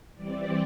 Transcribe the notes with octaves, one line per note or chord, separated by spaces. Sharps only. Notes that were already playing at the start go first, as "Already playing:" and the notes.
E3 G3 C4 D5